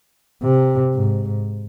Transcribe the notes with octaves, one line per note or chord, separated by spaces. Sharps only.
C3
G#2